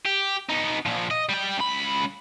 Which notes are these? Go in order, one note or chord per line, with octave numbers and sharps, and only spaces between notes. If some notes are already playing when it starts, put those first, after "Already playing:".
G4
B3 D#4
A#2 F3
D#5
G3 G5
C#2 B5